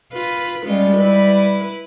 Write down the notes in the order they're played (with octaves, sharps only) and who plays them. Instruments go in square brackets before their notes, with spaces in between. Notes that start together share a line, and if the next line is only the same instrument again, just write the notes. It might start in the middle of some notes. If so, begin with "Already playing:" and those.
[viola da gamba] F4 B4
[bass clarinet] G3 [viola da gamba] G#3 C#4 F4
[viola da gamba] E4 B4